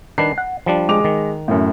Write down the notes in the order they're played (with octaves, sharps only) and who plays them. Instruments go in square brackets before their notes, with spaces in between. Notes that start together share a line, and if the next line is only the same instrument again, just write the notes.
[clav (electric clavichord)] D#3 D4 B4 [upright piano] C7
[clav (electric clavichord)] F#5
F3 G3 D4
[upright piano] G#3 D6 F7
[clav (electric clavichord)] D#3
[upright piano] F#2 A2